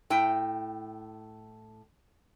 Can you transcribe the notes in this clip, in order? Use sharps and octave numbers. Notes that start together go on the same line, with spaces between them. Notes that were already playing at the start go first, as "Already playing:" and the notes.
A2 G5